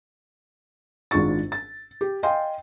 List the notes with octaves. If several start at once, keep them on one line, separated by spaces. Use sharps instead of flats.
G#1 G#2 D4 F4 C#6 A6
A6
G4
D#5 F5 G5 G#5 C6